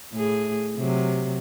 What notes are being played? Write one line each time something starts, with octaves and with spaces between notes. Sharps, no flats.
A2 G#4
C3 F#3